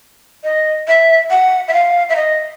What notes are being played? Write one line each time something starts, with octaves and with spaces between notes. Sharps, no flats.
D#5
E5
F#5
E5
F5
E5
D#5